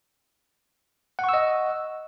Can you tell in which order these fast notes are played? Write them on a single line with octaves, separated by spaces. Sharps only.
F#5 C#6 E6 D#5